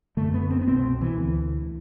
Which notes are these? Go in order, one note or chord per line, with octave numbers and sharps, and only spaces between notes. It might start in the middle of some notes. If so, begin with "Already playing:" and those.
F#2 D3 A3
B3
C4
B3
C2 B2 C4
E3
D2 D3